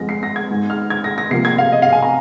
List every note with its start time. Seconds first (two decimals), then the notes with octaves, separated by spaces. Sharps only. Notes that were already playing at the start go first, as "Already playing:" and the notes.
Already playing: F2 F3 G#3 A#6
0.09 C7
0.23 A#6
0.36 G#6
0.50 G#2 G#3
0.70 F6
0.90 G#6
1.04 A#6
1.18 A#6
1.31 C3 F3 A#3 C7
1.45 G#6
1.58 F5
1.72 D#5
1.82 F5
1.92 G#5
2.02 A#5